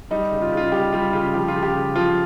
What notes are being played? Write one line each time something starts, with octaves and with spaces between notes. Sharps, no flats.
G3 D#4
C#3
F4
C#3
F4
G3 G4
G3 F4
C#3 F4
F3 G4
F4
C#3
G4
C#3
F3 F4